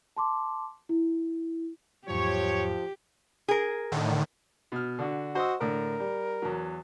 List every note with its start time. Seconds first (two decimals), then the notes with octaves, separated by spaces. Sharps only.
0.17 A5 C6 D6
0.89 E4
2.08 E2 G#2 F3 F#3 G4 C#5
3.48 G#4 A#4
3.92 A2 D3 D#3
4.72 B2 F6
4.99 D3 F#4
5.35 F#4 C5 D#5 E6
5.61 A2 D3 A#4
5.99 G3
6.42 E2 F#3